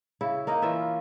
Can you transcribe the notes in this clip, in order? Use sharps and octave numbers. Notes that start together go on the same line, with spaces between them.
C#3 E4
A#3 D#4 A#4 D#5
E3 C#4 F4 E5